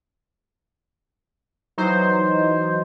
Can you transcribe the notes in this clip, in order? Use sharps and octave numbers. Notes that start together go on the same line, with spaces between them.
E3 F#3 D#4 C5